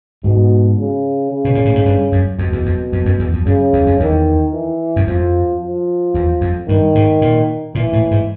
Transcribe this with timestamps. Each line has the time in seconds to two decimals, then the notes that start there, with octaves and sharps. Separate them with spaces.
0.24 G#2 B2
0.78 C#3
1.31 C#3
1.45 B2
1.55 A#2
1.65 A2
1.75 G#2
1.85 G2
2.12 F#2
2.39 F2 B2
2.52 E2
2.66 F2
2.92 F2
3.05 F#2
3.19 E2
3.33 F2
3.46 F#2 C#3
3.73 E2
3.86 F2
4.00 E2 D#3
4.53 E3
4.96 F#2
5.07 F2 F3
5.61 F3
6.14 E2
6.41 F2
6.68 G2 D#3
6.95 G#2
7.22 A#2
7.75 A#2 E3
7.93 A2
8.11 G#2